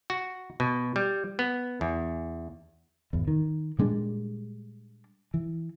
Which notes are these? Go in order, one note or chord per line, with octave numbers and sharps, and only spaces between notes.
F#4
B2
G3
B3
E2
G#1 E2
D#3
A#2 G3 G#3 D4
E3